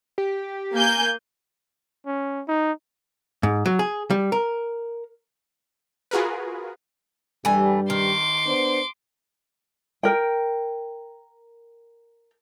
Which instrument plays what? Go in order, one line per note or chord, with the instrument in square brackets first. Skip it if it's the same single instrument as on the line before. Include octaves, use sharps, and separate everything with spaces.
[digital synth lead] G4
[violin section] A#3 G#5 G6
[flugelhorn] C#4
D#4
[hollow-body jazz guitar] G#2
F#3
G#4
G3
A#4
[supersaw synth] F4 F#4 G#4 A#4 B4
[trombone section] G2 G3 [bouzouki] E3 A3 G#5
[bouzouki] D#3 [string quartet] C6 D6
[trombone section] B3 D4 C5
[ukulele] A#4 G5